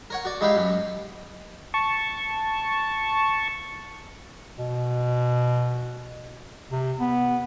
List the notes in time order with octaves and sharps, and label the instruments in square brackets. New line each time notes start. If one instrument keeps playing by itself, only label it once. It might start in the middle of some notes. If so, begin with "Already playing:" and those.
[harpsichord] A#4 C#5 F#5
F#4 D5
G#3 D#4 E4 G4 B4 F5
F#2 C#4
[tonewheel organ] A5 C#6
[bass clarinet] B2
C3
B3